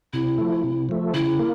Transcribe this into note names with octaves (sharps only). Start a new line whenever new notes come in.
C3 E4
F3 A3
C3
F3 A3
C#3 E4
A#3